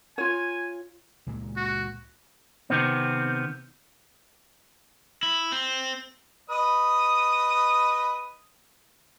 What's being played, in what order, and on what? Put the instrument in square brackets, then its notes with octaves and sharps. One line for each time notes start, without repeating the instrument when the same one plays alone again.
[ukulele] F4 C#5 [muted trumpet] G#5
[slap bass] C#2 A#2 G#3
[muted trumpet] F#4
[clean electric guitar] C3 D#3 B3 C4
[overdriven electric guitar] E4
C4
[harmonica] B4 D#5 D#6